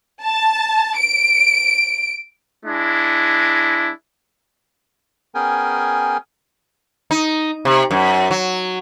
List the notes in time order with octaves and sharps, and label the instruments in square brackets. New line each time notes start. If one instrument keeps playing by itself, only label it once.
[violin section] A5
D7
[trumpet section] G#3 D4 E4
[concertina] B3 C#4 G#4 A#4 G5 G#5
[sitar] D#4
C3
F#2
F#3